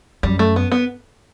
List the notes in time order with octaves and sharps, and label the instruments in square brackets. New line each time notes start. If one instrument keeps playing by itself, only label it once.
[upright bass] F#2 [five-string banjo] G3
[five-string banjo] A3
B3
B3